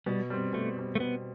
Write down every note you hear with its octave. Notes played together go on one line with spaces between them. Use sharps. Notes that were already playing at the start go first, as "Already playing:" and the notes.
B2 G3
G3 C4
B2 A3
G3 C4
A3
B2 B3